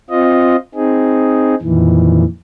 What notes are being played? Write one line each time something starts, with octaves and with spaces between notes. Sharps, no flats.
C4 F4 D#5
C4 D#4 G#4
F2 A#2 D#3 E3